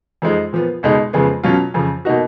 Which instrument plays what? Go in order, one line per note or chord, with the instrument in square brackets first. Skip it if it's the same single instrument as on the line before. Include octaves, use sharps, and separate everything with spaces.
[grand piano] F2 F3 G#3 D#4
A#2 F3 B3
C#2 B2 G#3 D#4
F2 C#3 G#3 B3
B2 F#3 C#4 F4
F2 C#3 F3
B2 A#3 D#4 F#4